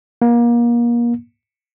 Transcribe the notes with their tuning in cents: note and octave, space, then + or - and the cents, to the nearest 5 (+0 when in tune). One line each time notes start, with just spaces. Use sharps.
A#3 +30